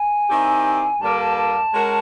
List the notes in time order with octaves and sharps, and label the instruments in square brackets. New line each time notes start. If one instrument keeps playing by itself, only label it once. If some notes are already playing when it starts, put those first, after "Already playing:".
Already playing: [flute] G#5
[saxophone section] D#3 G3 C4 E4 G4
[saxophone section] G2 D3 G3 A#3 [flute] A5
[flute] A5
A5
[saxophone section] G#3 C#4 F#4 A#4